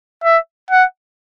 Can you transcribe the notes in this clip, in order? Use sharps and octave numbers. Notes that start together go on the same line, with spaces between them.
E5
F#5